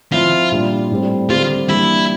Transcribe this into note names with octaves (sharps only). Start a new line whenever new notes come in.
F3 C4 E4 F4
A#2 G3 D4
A2 G3 C4
D3 G3 C4 F4 G4
E3 G3 A#3 D4 E4